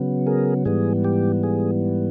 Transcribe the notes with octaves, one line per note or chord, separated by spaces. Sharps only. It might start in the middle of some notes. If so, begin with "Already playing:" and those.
Already playing: C#3 F#3 B3
G#4 A#4
G#2 E3 G3 B3 G#4
G4
G#4